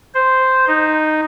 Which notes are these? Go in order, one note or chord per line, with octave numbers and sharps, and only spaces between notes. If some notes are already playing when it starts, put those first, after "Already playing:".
C5
D#4